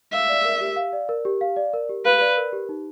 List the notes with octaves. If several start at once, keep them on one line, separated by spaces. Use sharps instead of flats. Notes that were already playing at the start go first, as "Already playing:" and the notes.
E5 F5
D5
A#4
G4
F5
D5
A#4
G4
F5
D5
A#4
G4
B4 F5
D5
A#4
G4
D#4